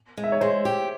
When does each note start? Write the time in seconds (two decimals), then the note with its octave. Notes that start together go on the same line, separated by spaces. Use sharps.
0.17 G#3
0.24 E5
0.32 C#5
0.41 G#3 C5
0.65 G4